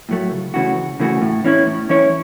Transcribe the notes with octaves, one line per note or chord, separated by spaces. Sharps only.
A2 F#3 A3
C#2
C#3 E3 A3 F#4
C#2
C#3 E3 A3 F#4
A2
E3 C#4 E4 C#5
A2
E3 C#4 E4 C#5